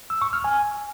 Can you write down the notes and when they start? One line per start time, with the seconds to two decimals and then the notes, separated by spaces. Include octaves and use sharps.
0.10 E6
0.22 C#6
0.33 F6
0.44 G#5